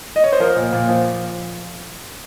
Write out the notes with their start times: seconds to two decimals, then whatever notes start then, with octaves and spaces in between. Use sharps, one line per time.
0.16 D#5
0.24 C#5
0.33 C5
0.40 F3 A#4
0.56 A#2
0.72 A#2
0.89 F3